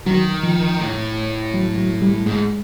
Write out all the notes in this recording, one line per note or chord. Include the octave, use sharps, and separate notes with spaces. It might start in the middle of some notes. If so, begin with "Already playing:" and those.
D#3 F#3
F3
A2
F#3
F#3
G3
G#2 G#3